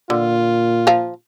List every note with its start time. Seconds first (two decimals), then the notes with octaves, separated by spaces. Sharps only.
0.10 A#2 D3 F4
0.87 F3 F5 A#5